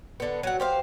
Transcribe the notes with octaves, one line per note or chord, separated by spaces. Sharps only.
D3 B3
F#3 F#5
G4 C5 F5